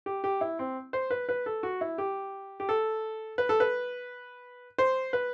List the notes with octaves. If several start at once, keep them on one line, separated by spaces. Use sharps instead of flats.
G4
G4
E4
C4
C5
B4
B4
A4
F#4
E4
G4
G4
A4
B4
A4
B4
C5
B4